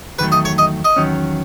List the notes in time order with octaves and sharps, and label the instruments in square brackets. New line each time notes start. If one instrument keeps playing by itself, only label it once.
[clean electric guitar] E2 D#3 F#3 A3 [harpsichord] B4
[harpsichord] D#5
C#5
D#5
D#5
[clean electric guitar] E2 D#3 F#3 C#4